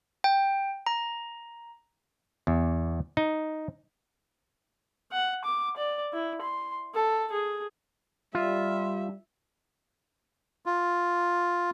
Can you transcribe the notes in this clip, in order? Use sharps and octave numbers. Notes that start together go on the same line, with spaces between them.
G5
A#5
E2
D#4
F#5
D6
D5
E4
C6
A4
G#4
G3 F4 E5
F4